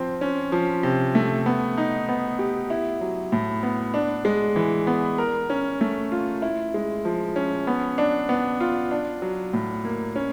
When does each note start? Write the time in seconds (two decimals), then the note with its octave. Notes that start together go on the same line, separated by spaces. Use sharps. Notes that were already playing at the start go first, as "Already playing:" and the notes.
Already playing: F3 C4
0.21 C#4
0.52 F3
0.83 C3
1.15 A3
1.46 B3
1.78 D#4
2.09 B3
2.39 G4
2.70 E4
3.01 F#3
3.32 A2
3.63 B3
3.94 D4
4.25 G#3
4.56 E3
4.87 B3
5.18 A#4
5.50 C#4
5.81 A3
6.12 F4
6.42 E4
6.74 G#3
7.05 F3
7.36 C#4
7.67 B3
7.98 D4
8.29 B3
8.60 F4
8.91 D4
9.22 F#3
9.53 A2
9.85 A#3
10.16 C#4